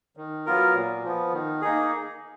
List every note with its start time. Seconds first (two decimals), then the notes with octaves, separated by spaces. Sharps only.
0.17 D#3
0.46 F#3 B3 F4 A#4
0.75 A#2
1.04 F3 B3
1.33 D#3
1.62 A#3 D#4 G#4